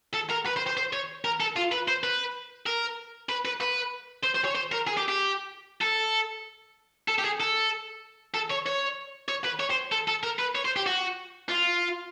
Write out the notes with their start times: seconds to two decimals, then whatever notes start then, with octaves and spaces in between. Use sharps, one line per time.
0.14 A4
0.30 A#4
0.46 B4
0.56 C5
0.67 C5
0.77 C5
0.93 C#5
1.25 A#4
1.40 A4
1.56 F4
1.72 B4
1.88 C5
2.03 B4
2.66 A#4
3.29 B4
3.45 B4
3.61 B4
4.24 C5
4.35 C5
4.45 C#5
4.55 C5
4.72 A#4
4.87 G#4
4.97 G4
5.09 G4
5.82 A4
7.08 A4
7.18 G4
7.24 G#4
7.40 A4
8.34 A4
8.50 C#5
8.66 C#5
9.29 C#5
9.45 B4
9.60 C#5
9.71 C5
9.92 A4
10.08 A4
10.23 A#4
10.39 B4
10.55 C#5
10.65 C5
10.76 G4
10.86 F#4
11.49 F4